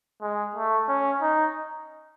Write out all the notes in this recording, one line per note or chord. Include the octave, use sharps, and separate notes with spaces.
G#3
A3
C#4
D#4